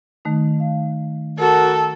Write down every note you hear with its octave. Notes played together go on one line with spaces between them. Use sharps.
D#3 A3 D#4
F5
F#4 A4 A#4